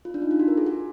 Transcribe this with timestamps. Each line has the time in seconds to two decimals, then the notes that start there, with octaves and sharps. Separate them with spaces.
0.05 F4
0.14 D4
0.22 D#4
0.31 F4
0.40 F#4
0.48 A#4
0.58 G#4
0.66 F#4